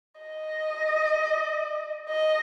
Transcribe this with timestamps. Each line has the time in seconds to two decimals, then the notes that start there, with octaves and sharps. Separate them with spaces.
0.21 D#5
2.09 D#5